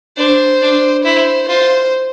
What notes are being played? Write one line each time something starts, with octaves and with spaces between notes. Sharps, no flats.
D4 C5
D4
E4 C5
F4 C5